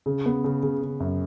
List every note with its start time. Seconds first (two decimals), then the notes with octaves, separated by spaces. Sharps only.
0.06 C#3
0.26 B3
0.44 C#3
0.63 C#3
0.82 C#3
1.00 F#2